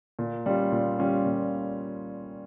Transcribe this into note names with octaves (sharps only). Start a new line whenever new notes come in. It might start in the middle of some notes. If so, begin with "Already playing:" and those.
A#2
G3 C#4 F4
A#2
G3 C#4 F4
A#2